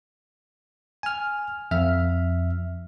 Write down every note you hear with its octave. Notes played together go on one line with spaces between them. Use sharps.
G#5 F6
F2 E5 F6